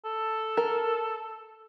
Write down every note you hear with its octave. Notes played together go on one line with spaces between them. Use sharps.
A4
A#4